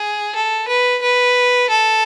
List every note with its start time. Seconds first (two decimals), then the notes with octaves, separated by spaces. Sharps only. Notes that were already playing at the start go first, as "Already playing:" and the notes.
Already playing: G#4
0.35 A4
0.68 B4
1.02 B4
1.70 A4